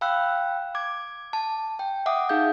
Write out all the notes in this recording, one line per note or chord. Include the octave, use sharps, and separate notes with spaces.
F5 G5 B5 E6 F#6
D6 G#6
A5
G5
E5 F#5 D6 D#6
D#4 G#4 F5 G6